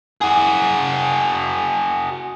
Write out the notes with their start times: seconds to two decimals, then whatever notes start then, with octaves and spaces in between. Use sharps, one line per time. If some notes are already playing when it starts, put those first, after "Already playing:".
0.22 F#4 G#4